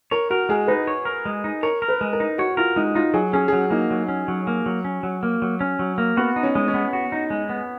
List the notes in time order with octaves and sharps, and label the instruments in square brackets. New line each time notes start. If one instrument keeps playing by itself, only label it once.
[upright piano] A#4 [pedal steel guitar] C#5
[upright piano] F#4 [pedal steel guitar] A#4
[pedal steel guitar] G#3 [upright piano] G#4
[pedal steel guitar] D#4 [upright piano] B4
[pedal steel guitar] C#5
A#4
G#3
D#4
[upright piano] A#4 [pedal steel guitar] C#5
[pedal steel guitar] A#4
[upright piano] B4
[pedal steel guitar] G#3
[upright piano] A#4
[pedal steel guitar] D#4
[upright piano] F#4 [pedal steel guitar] C#5
[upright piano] F4 [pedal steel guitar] A#4
[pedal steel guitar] G#3 [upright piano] D#4
[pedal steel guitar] D#4 [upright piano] F4
[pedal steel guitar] F#3 [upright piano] G#4
[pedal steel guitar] C#4 [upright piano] G#4
[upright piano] G#4
[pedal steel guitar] F#3 [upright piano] F#4
[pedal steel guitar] A#3 [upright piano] D#4
[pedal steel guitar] F#3
C#4
F#3
A#3
F#3
C#4
F#3
A#3
F#3
C#4
F#3
A#3
[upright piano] B3 [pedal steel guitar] F#4
[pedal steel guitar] D#4
[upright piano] C#4
[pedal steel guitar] G#3
[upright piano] C#4
[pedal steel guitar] B3
F#4
D#4
G#3
B3